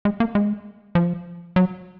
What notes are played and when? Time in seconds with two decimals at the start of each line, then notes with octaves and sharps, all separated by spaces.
0.05 G#3
0.20 A#3
0.35 G#3
0.95 F3
1.56 F#3